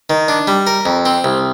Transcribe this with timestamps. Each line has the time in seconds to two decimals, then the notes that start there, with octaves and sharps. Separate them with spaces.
0.10 D#3
0.28 D4
0.47 G3
0.67 A#4
0.86 F2
1.05 C4
1.24 C2